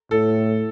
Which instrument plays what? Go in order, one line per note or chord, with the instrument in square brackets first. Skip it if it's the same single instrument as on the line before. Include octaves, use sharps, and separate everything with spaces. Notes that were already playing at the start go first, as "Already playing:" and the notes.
[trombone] A2 [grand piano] A4